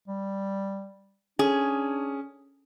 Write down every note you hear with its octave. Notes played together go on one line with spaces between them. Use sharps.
G3
C#4 D4 G#4